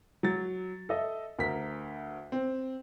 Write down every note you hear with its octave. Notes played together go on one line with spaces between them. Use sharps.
F#3 A6
A4 D#5 E5
D2 A#4 B6
C4